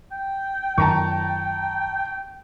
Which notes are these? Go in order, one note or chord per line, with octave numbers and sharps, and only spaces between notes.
G5
F#2 D#3 A5 A#5 C#6